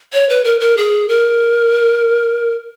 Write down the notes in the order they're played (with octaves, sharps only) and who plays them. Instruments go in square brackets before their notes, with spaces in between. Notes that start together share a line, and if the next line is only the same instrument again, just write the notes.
[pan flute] C#5
B4
A#4
A#4
G#4
A#4